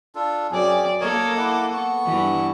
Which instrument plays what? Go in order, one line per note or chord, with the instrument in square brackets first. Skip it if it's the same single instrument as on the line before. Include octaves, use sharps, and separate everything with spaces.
[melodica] D4 F4 A4
[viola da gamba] F#2 D5 [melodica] C4 C#4 G#4
[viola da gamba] A#3 A4 [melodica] A#4 C#5 D#5
[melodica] E4 F#5 D6
B3 C#6
[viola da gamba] G2 E3